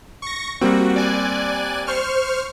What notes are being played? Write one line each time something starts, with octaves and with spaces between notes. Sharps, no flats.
C#6 A#6
G3 A#3 C4 F#4
D5 G#5 F#6
C5 C#6 F6